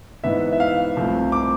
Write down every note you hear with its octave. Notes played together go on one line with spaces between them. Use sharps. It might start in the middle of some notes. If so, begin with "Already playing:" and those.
G#2 E3 B3 E5
E5
F5
C2 C3 F3 A3 C4
D6